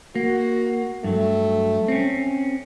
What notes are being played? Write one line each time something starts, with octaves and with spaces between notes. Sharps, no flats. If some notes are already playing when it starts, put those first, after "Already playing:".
A#3 F#4
G2 F#3 A3
C4 C#4